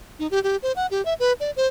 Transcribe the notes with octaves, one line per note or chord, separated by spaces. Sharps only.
D#4
G4
G4
C5
F#5
G4
E5
B4
D5
C5